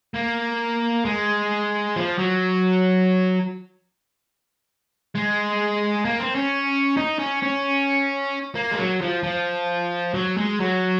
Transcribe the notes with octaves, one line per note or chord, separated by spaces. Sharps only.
A#3
G#3
F3
F#3
G#3
A#3
C4
C#4
D#4
C#4
C#4
A#3
G#3
F#3
F3
F3
F#3
G#3
F#3